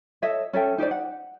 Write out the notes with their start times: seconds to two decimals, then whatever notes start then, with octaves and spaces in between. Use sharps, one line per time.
0.22 A4 C#5 D#5 E5
0.53 C#4 A4 E5 G5
0.78 D#4 G4 C5 D5
0.91 F#5